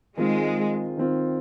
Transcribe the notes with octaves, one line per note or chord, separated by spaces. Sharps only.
D#3 G#3 C4 F4
D#3 C4 F4